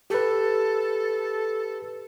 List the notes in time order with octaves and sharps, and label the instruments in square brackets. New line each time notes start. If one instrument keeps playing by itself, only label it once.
[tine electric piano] G4 B4 [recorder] A4